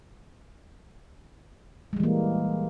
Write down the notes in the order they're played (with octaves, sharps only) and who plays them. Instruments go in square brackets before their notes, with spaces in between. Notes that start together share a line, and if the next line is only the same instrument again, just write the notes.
[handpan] G#3
G3
E3
A#3